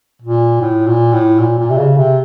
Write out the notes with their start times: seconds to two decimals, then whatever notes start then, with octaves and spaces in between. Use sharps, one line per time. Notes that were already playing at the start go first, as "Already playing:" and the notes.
0.22 A#2
0.61 A2
0.87 A#2
1.13 A2
1.39 A#2
1.59 A#2
1.70 C3
1.78 C#3
1.97 C3